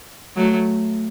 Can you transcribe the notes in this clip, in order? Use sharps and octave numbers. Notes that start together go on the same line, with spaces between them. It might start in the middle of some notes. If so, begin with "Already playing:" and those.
F#3 A3